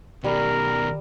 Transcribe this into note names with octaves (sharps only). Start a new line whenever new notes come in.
B2 D#3 G3 A#4